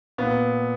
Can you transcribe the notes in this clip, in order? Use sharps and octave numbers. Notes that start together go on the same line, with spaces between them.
A#2 B3